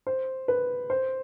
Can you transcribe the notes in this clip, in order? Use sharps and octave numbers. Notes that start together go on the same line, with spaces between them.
C5
B4
C5